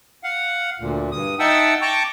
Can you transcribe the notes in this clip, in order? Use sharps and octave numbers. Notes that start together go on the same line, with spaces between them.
F5 F#5
D2 A#2
G2 D#6
D#4 E5 F#5 G5 A5 E6
G5 A5 A#5 C#6 D6